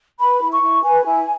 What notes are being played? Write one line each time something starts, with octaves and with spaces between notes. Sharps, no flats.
B4 B5
E4
C#6
E4
B4 G#5
E4